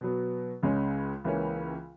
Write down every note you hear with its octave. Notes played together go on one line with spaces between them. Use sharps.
B2 F#3 B3
C#2 C#3 G#3 C#4
C#2 C#3 E3 A#3 C#4